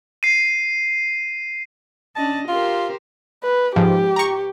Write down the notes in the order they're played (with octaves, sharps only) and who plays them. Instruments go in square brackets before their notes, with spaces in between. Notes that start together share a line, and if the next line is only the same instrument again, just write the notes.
[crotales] C7 D#7
[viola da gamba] C#4 D4 D#5 [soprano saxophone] A5
[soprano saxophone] F4 [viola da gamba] G4 A#4 C5
[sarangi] B4
[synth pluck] G#2 F3 [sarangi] G4
[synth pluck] A#5 C#6